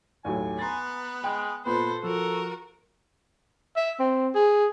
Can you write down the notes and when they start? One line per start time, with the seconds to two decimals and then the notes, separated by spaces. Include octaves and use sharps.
0.25 D#2 A2 F#3 G#5
0.59 B3 B4 A#5 C6 A6
1.24 G#3 G5
1.66 A#2 B3 A4 B4 C5
2.03 F3 F#4 A4 A#4
3.77 E5
3.99 C4
4.35 G#4